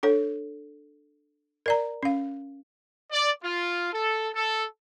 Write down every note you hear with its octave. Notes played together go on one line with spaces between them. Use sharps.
D4 A4 C#5
A#4 D5 A#5
C#4 F5
D5
F4
A4
A4